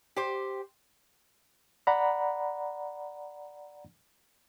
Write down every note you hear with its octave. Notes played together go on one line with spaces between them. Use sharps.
G4 C5
D5 F#5 A#5 B5